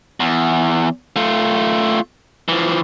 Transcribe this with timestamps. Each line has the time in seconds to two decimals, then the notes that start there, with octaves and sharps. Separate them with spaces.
0.20 E2
1.16 A3 F4
2.48 E3 F3